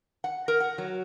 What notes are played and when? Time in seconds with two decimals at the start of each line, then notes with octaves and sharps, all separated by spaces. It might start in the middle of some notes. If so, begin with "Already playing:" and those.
0.24 F#5
0.48 A#4
0.60 F#5
0.78 F#3